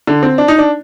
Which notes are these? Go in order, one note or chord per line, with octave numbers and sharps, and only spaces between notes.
D3
C4
D4
D#4
D4